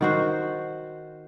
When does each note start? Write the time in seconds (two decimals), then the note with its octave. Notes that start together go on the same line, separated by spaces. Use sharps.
0.01 D#3 F#4 C5